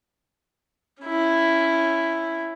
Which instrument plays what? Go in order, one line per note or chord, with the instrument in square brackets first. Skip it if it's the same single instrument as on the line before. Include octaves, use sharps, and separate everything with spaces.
[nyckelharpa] C#4 E4